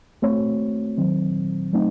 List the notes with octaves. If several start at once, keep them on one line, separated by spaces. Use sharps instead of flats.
A3 C4 F#4 C#5
D#3 F#3 C4
F#3 A3 C4 D#4